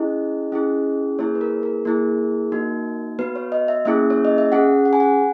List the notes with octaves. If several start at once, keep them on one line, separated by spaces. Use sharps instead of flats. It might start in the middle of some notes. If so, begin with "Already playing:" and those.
Already playing: C#4 E4 G#4 D#5
C#4 E4 G#4
A#3 E4 G#4 C#5
B4
A#4
A#4
A#3 E4 G#4
A#3 D#4 F#4
B3 F#4 B4
C#5
D#5
E5
A#3 C#4 E4 G#4 E5
C#5
D#5
E5
C#4 G#4 F#5
F#5
G#5
F#5